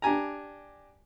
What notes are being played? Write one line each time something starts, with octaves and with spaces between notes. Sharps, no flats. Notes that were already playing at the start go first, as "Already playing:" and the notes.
D4 G4 G#5 A#5